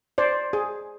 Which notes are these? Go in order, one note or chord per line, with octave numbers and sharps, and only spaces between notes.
C5 D5
G#4